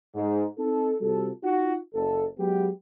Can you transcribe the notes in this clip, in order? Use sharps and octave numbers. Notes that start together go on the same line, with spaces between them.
G#2
C4 D#4 A4
C3 G3 F4 F#4 A4
D#4 F4 F#4
F#1 A4
F#3 G#3 B3 G4